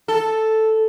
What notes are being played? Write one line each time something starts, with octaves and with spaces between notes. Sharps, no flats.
A4